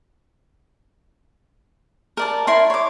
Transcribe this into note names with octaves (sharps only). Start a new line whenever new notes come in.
A#4 D5 A5
E4 A#4 C6
C#5 D6